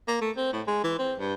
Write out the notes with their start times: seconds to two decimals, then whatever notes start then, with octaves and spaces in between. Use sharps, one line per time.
0.08 A#3
0.21 A3
0.37 C4
0.53 A2
0.68 G#3
0.84 E3
0.99 C4
1.20 G2